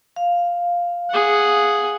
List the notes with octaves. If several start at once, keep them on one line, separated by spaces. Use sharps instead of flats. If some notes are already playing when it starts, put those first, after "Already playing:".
F5
G#4 F#5